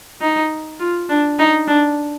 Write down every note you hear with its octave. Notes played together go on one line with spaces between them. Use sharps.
D#4
F4
D4
D#4
D4